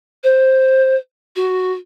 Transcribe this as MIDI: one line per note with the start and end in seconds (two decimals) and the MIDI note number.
0.23 0.95 72
1.36 1.72 66